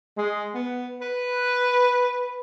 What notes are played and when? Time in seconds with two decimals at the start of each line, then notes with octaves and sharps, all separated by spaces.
0.17 G#3
0.55 B3
1.02 B4